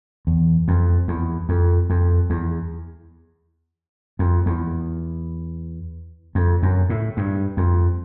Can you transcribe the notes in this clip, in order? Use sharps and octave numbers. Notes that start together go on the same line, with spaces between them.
E2
F2
E2
F2
F2
E2
F2
E2
F2
F#2
A2
G2
F2